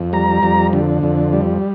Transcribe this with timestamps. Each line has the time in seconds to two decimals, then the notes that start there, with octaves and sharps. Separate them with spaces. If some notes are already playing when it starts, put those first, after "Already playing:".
Already playing: F2
0.13 G3 A#5
0.43 F2
0.73 D3
1.03 F2
1.33 G3